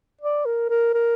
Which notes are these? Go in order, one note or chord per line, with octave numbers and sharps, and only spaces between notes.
D5
A#4
A#4
A#4